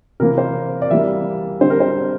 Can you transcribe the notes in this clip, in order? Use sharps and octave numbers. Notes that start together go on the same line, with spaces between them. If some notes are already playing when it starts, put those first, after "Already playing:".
C3 E3 A#3 A#4
C5
D5
E3 G3 A#3 E5
D3 G3 C4 C5
A#4
C5